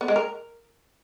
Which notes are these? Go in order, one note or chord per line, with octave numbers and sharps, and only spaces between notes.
B3
G#3
A#4